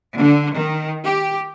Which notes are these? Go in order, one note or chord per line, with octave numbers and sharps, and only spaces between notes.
D3
D#3
G4